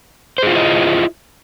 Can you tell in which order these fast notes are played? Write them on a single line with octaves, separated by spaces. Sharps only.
C5 G#4 F4 E4 D#5